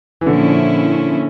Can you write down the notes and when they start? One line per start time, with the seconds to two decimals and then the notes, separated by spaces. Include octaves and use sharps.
0.21 E3
0.26 A#2 D3 F3 C#4 E4